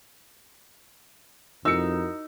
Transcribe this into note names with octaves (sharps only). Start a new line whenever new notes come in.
F2 D#4 E4 F#4 A#4 E6 C#7